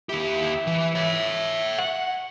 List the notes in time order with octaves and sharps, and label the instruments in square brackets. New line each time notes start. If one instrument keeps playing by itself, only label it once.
[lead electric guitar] D#2 G4 [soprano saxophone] E4
[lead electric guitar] E3
C#5 E5
[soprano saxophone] F#5